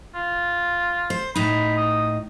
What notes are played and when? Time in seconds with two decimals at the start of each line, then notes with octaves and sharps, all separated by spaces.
0.15 F4
1.10 C5
1.35 A2 D#4 B5
1.77 D#6